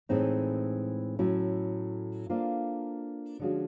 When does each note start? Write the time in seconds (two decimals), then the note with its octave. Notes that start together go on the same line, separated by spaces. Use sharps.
0.09 A2 E3 G#3 C4 D#4
1.19 A2 F#3 A3 C#4 E4
2.30 A#3 D4 F4 A4 C5
3.39 D3 F3 G#3 C#4 F#4